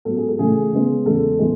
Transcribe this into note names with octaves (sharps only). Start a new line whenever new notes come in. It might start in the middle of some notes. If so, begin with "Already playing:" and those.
G#2 F#3 B3 A4
G#4
A4
C#3 E3 A3 G#4
C#3 G#3 B3
E2 C#3 G#3 A4
E3 G#3 B3